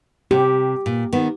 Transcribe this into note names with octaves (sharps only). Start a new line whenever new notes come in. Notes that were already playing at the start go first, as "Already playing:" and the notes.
C3 G4
A#2
D#3 B3